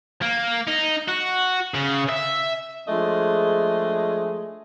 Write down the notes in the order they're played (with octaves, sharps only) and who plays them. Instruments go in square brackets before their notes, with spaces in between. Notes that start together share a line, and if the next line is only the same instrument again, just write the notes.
[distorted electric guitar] A#3
D#4
F#4
C#3
E5
[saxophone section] F3 G#3 A3 D4 G#4 D#5